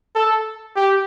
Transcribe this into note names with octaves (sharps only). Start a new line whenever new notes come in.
A4
G4